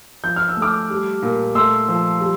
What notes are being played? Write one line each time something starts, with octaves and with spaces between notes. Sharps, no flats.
F3 G6
F6
E6
A3
D6 F6
G3
A#2
A3 C6 E6
F3
G3